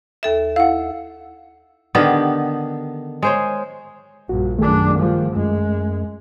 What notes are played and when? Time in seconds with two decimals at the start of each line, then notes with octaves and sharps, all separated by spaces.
0.23 D#2 A4 E5
0.56 E4 F5 F#5
1.95 D3 D#3 B3 G4
3.22 G#3 C5 C#5
4.29 A#1 G2 F#4
4.58 F#2 D#3 A3 D4 G#4
4.95 G2 F3
5.36 F#2 G#3